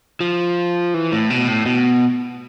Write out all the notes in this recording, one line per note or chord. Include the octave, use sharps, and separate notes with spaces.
F3
E3
A2
B2
A2
B2